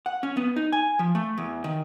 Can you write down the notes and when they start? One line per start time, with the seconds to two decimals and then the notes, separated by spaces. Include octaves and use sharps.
0.06 F#5
0.23 C#4
0.37 B3
0.56 D#4
0.72 G#5
0.99 F3
1.15 A3
1.38 E2
1.64 D#3